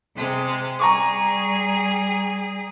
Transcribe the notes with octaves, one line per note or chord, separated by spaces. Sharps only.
C3 G#3
G3 G#4 A#5 C#6 D6